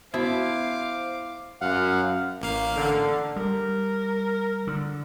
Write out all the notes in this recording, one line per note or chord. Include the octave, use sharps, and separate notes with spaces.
B3 E4 F#4 C5 F5 D6
F#2 F5 F#5
A1 A#3 F5
D3
G3 A#4
D3